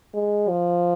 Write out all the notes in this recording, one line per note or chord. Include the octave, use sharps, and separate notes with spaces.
G#3
F3